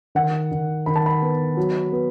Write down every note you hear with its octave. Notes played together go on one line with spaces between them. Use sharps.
D#3 F#5
D#3
D#3 B5
A5
B5
B3
F#3
B3